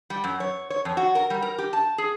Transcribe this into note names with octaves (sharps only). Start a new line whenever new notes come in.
G3
F#2
C#5
C#5
F2
F#4
A#4
G3
A#4
G4
A5
G#4